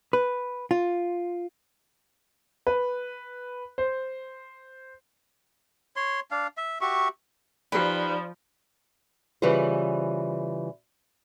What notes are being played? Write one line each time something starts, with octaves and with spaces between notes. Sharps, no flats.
B4
F4
B4
C5
C#5 C6
D4 F5
E5
F#4 G4 E5 C#6
F3 D#4 G4 B4 D5 G5 B5
C#3 E3 G3 F4 B4 C5